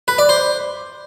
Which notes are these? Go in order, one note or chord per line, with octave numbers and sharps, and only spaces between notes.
B4
D5
C5